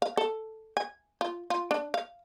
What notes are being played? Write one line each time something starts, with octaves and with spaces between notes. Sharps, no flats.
F5
A4
G#5
F4
F4
D4
F5